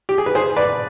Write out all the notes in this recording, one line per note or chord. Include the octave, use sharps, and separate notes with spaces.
G4
G#4
B4
G#4 C5
B4 D5